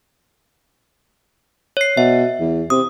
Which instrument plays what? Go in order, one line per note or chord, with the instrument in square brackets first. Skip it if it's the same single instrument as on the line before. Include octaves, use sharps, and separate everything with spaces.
[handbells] C#5 C7
[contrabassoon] B2 [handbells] E5
[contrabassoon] E2
[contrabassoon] C3 [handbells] D#6